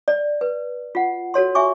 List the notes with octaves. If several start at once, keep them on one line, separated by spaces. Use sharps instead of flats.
D5
B4
F4 F#5
F#4 A4 C#5 C6
E5 G#5 C#6 D6